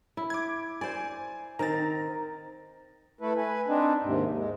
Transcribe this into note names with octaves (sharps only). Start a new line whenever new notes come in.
E4
D6 G#6
C5 D5 G#5
D#3 C4 A#5 A6
A3 E4 A4 B4
B4 G#5
C4 D4 D#4
D#2 G#2 C3
G#3